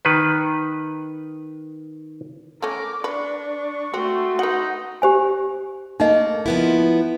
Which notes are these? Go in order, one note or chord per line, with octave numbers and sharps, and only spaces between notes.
D#3 B4
A3 C#4 A#4 D6
D4 B4 C#6
A3 C4 F#4 C6
D#4 B4 F#5
G4 C5 G#5
A3 A#3 D#4 D#5
F3 B3 E4